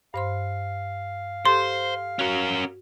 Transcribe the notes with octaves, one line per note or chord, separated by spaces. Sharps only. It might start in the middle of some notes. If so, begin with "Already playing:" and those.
G2 C5 F5 C6
G4 A4 C5 C6
C#4 F#4 A#4